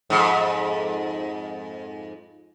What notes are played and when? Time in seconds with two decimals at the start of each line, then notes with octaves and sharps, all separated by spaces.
0.10 F2 G#2